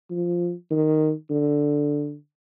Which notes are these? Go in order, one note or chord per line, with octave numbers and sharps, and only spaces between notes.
F3
D#3
D3